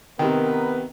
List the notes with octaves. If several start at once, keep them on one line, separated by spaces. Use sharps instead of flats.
C3 D#3 B3 A#4 B4